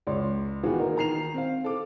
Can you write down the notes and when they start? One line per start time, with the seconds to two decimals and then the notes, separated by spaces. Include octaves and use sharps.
0.07 C#2 C#5 D5 C6
0.63 D#3 E3 B3 F4 F#4 G#4
0.79 A#3 D#4 A#4
0.96 D#3 A#5 C7 F7
1.34 C4 F5
1.64 A4 D6